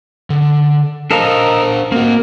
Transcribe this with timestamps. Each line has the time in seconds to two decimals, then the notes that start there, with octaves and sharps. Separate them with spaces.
0.30 D3
1.11 D4 A4 A#4 C5 D#5 F5
1.92 A#3 C4 F#4